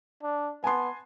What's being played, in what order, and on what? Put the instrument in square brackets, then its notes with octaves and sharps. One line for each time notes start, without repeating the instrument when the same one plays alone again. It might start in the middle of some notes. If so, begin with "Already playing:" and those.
[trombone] D4
[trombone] B3 [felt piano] G#5 A5 C6